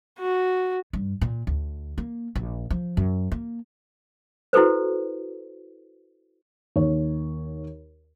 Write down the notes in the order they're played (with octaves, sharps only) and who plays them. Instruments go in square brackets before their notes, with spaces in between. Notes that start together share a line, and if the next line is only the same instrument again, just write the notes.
[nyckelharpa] F#4
[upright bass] G2
A#2
D2
A#3
A#1
F3
F#2
A#3
[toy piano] E4 F#4 A4 B4 C5
[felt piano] D#2 C#5